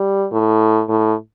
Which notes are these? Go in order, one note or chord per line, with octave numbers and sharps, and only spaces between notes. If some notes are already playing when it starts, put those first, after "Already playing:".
Already playing: G3
A2
A2